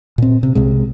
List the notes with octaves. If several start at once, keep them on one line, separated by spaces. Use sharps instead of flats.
A#2 C4
C3
C2 C3 G#3